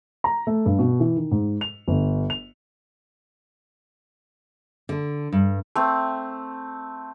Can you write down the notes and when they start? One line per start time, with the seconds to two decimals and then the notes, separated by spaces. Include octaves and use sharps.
0.24 A#5
0.47 A3
0.66 G2
0.79 B2
1.00 E3
1.16 D#3
1.31 G#2
1.61 F7
1.88 G1
2.30 F7
4.89 D3
5.32 G2
5.75 A3 C4